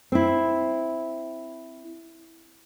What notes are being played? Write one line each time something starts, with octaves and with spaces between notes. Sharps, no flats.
C4 E4